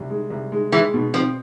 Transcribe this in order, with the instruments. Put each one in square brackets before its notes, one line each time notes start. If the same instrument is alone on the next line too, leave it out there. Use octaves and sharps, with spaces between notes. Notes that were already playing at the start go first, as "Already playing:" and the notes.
Already playing: [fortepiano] C2
G#3
C2
G#3
[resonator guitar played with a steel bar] E3 [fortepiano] G#3
[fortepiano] B2
[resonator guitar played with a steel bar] F3 [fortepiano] C4